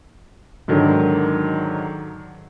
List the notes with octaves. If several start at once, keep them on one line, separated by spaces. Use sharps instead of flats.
G#2 D3 D#3 F#3